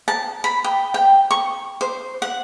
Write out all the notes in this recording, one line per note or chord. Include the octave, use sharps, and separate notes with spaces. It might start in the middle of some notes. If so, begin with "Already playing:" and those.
A5
B5
G5
G5
C#6
C5
F#5